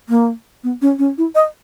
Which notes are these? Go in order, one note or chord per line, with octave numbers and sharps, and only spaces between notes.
A#3
B3
C#4
C#4
E4
D#5